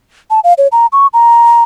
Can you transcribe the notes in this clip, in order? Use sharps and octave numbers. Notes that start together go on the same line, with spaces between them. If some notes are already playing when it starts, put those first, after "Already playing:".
A5
F5
C#5
A#5
C#6
A#5